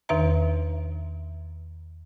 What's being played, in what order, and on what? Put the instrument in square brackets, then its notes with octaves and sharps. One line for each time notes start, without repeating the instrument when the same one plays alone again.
[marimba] E2 D#3 D#4 B4 E5 A#5